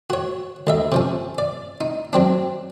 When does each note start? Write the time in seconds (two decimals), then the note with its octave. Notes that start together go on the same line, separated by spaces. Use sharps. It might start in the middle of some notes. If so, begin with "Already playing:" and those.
0.10 F#4 C#5
0.67 D2 D#5 E5
0.92 C3 F3 C#4
1.38 D5
1.81 D#4
2.13 F#3 C4 D4